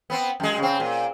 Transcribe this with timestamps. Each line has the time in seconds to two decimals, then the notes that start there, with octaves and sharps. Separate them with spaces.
0.10 B3 C4
0.40 F#2 G#3
0.58 C#3 C4
0.80 A#2